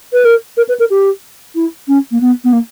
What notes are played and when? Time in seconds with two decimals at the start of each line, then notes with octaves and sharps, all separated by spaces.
0.13 B4
0.25 A#4
0.57 A#4
0.68 B4
0.79 A#4
0.90 G4
1.55 E4
1.88 C#4
2.11 A#3
2.21 B3
2.44 B3
2.53 A#3